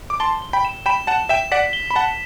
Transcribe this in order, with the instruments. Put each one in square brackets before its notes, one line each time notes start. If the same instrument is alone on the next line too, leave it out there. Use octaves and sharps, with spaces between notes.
[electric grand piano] D6
[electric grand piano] A5 C6 [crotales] G7
[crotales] G7
[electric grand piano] G5 B5
[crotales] E7
[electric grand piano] G5 B5 [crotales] E7
[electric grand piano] F#5 A5 [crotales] E7
[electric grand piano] E5 G5 [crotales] E7
[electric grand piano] D5 F#5 [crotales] B6
[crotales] G7
[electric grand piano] B5
[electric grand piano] F#5 A5 [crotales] G7